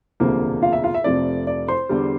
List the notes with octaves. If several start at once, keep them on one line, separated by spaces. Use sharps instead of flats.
E1 D2 C3 F3 A#3
F4 F5
E5
F4 F5
E5
F1 F2 C3 F3 A3 D5
D5
C5 C6
E2 D3 G3